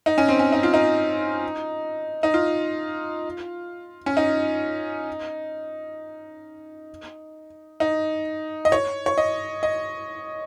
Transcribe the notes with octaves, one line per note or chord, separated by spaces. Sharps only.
D#4
C#4
C4
C#4
D#4
F4
D#4
D#4
F4
C#4
D#4
D#4
D#5
C#5
C#5
D#5
D#5